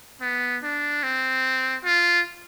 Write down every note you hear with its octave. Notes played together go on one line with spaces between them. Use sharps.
B3
D4
C4
F4